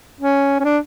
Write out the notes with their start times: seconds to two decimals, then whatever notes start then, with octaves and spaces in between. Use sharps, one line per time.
0.21 C#4
0.60 C#4
0.65 D4